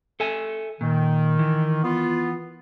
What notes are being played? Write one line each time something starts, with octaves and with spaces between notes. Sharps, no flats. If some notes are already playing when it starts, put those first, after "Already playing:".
A4 E5 G#5
A#2 D#3
E3
B3 F4